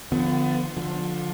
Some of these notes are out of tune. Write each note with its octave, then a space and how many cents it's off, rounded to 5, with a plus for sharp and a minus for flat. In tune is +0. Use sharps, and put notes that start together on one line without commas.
D3 +25 F3 +0 B3 +30
D3 +0 F3 +20